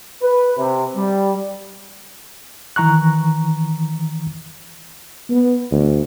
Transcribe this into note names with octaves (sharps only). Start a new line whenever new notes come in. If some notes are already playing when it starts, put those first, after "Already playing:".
B4
C3
G3
D#3 E3 A#5 C#6 F#6
B3
D2